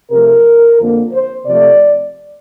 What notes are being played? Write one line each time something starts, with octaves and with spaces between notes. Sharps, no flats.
C3 F3 A3 A#4
F2 D3 F3 A#3
C5
C3 F3 A3 D5